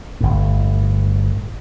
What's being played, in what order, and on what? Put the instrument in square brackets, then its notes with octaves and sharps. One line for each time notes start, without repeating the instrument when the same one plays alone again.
[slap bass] G1 A2